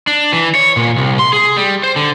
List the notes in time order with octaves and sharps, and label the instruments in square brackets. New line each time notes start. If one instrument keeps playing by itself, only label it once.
[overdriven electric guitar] D4
E3
C#5
A#2
C2
C6
G#4
G3
C5
D3